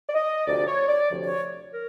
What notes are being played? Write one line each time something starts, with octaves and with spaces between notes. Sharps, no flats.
D5
D#5
D2 C3 F3 D5
C#5
D5
D2 C3 F3
C#5
A#4